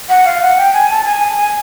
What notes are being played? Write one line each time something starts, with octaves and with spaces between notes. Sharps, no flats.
F#5
F5
F#5
G5
G#5
A5
G#5
G#5
G#5